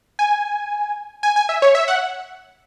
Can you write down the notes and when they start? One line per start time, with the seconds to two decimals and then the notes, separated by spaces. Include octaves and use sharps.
0.19 G#5
1.23 G#5
1.36 G#5
1.49 E5
1.62 C#5
1.75 E5
1.88 F#5